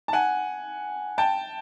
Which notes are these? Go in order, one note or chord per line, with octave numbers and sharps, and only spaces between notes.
A5
F#5 G#5
G5 A5